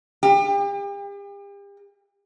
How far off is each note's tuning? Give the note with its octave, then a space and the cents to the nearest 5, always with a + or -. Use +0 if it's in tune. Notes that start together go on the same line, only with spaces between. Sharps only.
G4 +40